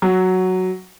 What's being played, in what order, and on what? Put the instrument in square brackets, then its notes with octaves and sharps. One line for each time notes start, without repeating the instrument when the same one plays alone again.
[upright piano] F#3